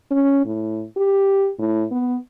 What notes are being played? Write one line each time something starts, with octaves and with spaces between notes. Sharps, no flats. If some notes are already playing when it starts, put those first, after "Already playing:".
C#4
A2
G4
A2
B3